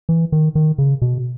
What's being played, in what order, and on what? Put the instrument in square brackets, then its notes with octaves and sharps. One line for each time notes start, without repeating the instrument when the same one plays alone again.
[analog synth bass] E3
D#3
D#3
C#3
B2